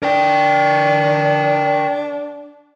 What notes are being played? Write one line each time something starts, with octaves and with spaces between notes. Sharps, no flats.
D4 A#4 G5